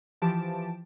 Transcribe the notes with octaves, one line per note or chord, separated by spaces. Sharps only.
E3 F3 G4 A5 D7